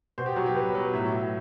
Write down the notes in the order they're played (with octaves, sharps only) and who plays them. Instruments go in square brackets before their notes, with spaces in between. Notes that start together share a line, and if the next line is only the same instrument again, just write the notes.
[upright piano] B2 C5
G4
F#3 F#4
G4
B2 B4
F#3
A2 E5
F#3